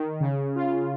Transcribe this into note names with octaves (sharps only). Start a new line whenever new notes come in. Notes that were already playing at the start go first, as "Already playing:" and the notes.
Already playing: D#3
C#3
F4